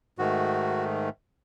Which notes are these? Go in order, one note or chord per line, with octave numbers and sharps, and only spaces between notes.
G#2 D#3 A3 F#4